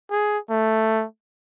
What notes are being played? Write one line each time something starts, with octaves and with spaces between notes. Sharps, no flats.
G#4
A3